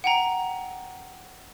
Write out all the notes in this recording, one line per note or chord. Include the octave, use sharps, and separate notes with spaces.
F#5 G5 A#5